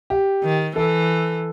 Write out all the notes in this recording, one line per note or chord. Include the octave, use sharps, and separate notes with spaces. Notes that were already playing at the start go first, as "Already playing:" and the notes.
G4
D#3
E3 A4